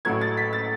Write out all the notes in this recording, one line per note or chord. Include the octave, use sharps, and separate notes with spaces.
A1 A2 F#3 A3 G#6
A6
B6
A6